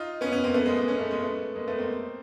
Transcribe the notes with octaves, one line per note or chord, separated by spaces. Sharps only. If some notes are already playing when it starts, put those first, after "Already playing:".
Already playing: D#4 F4
B3 C#4
B3 C#4
A#3 C4
A3 B3
G#3 A#3
G#3 A#3
B3 C#4
A3 B3
G#3 A#3
A3 B3
G#3 A#3
A3 B3
A#3 C4